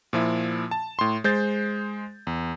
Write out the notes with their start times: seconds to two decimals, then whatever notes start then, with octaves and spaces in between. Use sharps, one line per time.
0.13 A#2 F3 E4
0.71 A5
0.99 A2 C6
1.24 G#3 C5 G6 A6
2.27 E2